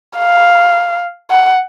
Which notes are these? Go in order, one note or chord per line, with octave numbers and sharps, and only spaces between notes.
F5
F#5